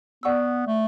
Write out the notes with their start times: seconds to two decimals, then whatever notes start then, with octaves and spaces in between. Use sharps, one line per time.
0.23 B3 D5 F#5 C#6 E6
0.67 A3